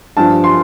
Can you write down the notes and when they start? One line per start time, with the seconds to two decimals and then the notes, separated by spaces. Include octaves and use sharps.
0.17 G2 F3 A5
0.44 C6